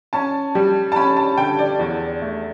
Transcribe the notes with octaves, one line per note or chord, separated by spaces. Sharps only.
C#4 A5
G3
A5
C#4 B5
A5
D3 G5
D5
E2
A3